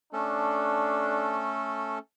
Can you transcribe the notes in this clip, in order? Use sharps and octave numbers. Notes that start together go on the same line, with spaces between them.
A3 C#4 D4 A4